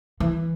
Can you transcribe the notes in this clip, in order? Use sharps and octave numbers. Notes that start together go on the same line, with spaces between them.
E3